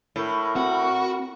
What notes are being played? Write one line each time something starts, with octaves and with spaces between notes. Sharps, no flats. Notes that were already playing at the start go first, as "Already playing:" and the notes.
A2 A#4 B5 C#6
C4 F#4